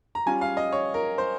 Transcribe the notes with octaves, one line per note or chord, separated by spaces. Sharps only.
A#5
G3 C#4 F4 G#5
F5
D#5
C#5
A#4
C5